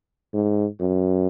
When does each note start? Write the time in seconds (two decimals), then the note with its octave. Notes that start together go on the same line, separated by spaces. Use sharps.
0.34 G#2
0.80 F#2